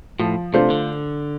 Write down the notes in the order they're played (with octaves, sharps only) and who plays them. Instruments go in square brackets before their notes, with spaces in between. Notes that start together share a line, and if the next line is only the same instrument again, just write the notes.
[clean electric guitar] A2 [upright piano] F3
[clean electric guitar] C3 [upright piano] A3 D4 F4 C5
[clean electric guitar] D3